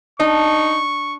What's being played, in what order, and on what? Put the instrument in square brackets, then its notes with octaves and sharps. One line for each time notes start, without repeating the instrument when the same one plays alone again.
[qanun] D4 [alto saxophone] D#4 [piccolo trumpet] C#6